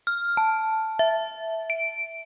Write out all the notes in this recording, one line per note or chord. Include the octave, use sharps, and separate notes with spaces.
F6
A5
E5
D7